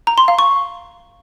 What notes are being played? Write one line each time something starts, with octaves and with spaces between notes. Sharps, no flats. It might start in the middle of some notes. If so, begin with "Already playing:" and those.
A#5
C6
F5
C#6